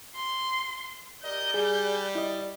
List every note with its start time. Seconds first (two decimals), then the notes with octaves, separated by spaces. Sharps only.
0.15 C6
1.24 G4 A#4 D5 D#5 G6
1.54 G3 G#4 G#5
2.15 E4 D#5